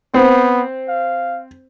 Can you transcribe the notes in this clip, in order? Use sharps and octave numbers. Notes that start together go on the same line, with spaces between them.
B3 C4
F5